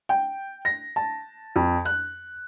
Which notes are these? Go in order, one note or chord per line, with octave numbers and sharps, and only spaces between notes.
G5
A#6
A5
F2
F#6